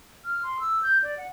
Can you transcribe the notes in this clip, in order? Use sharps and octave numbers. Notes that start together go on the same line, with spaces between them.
F6
C6
E6
G6
D5
F#5